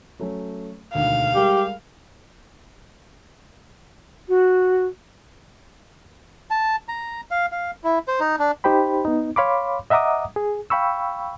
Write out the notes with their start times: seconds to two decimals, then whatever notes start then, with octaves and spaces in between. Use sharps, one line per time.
0.19 F#3 A3 C#4
0.94 E1 D2 D#3 F5
1.35 G3 G#3 G4 A#4
4.28 F#4
6.50 A5
6.89 A#5
7.31 F5
7.52 F5
7.84 E4
8.08 C5
8.20 D#4
8.39 D4
8.64 D#4 G4 C5 G5 B5
9.05 B3 D#4
9.36 C#5 F5 B5 C6 D6
9.90 D#5 E5 F#5 A#5 D6 D#6
10.36 G#4
10.70 F5 G5 B5 C#6 E6